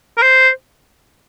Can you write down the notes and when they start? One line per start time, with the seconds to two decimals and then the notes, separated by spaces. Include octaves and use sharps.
0.17 A#4
0.22 C5